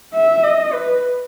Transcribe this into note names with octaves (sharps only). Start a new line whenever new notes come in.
E5
D#5
B4